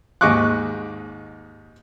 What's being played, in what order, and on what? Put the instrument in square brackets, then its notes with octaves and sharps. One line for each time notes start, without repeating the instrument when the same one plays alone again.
[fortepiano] D#2 G#2 D#5 C#6 D6 F#6